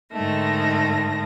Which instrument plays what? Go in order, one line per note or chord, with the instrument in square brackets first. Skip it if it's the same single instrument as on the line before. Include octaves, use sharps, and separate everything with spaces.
[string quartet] G#2 D3 D#3 A3 A#6